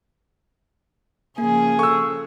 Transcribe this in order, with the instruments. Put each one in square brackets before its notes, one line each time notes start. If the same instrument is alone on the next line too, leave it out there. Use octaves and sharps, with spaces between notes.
[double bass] C#3 F3 [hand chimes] A#3 [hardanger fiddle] G#4
[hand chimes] A4 [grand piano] C#6 E6